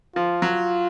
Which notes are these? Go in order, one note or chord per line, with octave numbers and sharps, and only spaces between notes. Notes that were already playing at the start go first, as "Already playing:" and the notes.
F3 F4
F#3